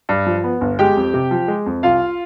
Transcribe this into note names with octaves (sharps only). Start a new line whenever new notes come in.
G2
F3
B3
G1
G#3 G4 G5
F2
C3
F3
G#3
F2
C2 F4 F5